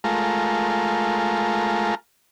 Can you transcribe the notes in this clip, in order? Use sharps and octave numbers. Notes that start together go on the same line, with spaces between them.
G#3 A3 F4 A#4